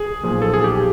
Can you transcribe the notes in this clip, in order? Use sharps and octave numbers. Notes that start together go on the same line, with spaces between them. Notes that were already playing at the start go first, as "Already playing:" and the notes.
Already playing: G#4
B1 A#2 F3
A4
G#4
G4